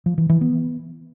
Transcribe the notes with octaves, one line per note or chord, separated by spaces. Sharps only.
F3
E3
E3
B3